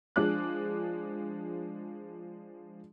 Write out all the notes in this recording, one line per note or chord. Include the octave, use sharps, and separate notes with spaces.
F3 G#3 D4 D6 F#6